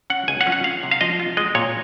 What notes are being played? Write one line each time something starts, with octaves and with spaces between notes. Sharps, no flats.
C#4 F#5
C#2 G#5
F#5
C#4
F#5
F4 F5
C3
F5
F3 D#5
F4
G#3 D#5
A#2 C#5